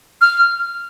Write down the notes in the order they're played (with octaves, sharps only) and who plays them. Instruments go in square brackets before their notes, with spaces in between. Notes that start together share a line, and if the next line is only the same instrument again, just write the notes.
[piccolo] F6